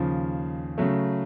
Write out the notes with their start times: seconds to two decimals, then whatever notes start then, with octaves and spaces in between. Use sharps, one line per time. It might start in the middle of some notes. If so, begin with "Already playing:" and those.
Already playing: D#2 C#3 F3
0.78 C#3 F#3 A3